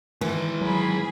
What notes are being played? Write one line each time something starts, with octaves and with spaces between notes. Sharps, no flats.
D#3 E3 G#3
F#3 G#4 B5